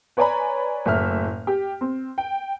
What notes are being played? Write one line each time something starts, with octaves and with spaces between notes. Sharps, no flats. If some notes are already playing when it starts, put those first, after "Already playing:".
B4 C#5 D5 G#5 A#5 B5
F#1 A2 E5 F6
G4
C4
G5